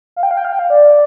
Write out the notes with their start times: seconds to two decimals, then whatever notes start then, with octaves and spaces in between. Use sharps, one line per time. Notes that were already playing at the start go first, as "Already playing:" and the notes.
0.16 F5
0.23 G5
0.31 F5
0.37 G5
0.45 F5
0.53 G5
0.59 F5
0.70 D5